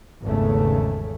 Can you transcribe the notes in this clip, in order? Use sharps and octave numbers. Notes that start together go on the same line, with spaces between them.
G#1 E2 G#2 C#3 A3